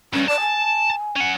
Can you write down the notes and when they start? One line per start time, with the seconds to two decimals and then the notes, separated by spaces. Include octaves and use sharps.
0.13 D2 G2 C#4
0.28 D5 A5
0.40 G#5
1.16 C#4 F#5